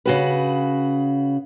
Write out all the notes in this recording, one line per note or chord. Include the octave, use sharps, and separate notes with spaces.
C#3 F#4 B4